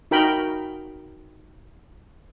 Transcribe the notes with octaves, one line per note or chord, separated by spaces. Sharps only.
D#4 F#4 A#4 G5 B5